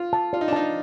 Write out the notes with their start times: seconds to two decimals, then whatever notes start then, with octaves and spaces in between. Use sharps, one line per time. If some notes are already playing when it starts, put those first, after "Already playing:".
Already playing: F4
0.13 A5
0.33 F4 D5
0.41 D#4
0.48 D4
0.53 D#4 A5